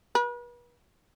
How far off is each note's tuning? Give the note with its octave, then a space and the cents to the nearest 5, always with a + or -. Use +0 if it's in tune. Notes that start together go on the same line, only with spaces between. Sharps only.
B4 -40